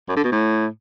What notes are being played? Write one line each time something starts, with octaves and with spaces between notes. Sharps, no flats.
F#2
D3
B2
A2